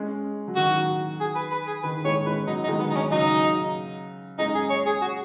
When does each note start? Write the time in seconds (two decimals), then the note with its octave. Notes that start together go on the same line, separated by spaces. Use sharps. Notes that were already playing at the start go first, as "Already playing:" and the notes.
Already playing: G#3 C#4
0.48 F#3
0.56 D#3 F#4
1.20 G#4
1.35 B4
1.51 B4
1.67 G#4
1.83 D#3 B4
2.04 D#3 G#3 C#5
2.26 G#3 C#4 B4
2.47 F#3 B3 D#4
2.63 D#4
2.68 D#3 G#3
2.79 B3
2.89 D#3 D#4
2.95 C#4
3.11 C#3 F#3 D#4
4.38 G#3 C#4 D#4
4.54 G#4
4.70 C#5
4.86 G#4
5.01 F#4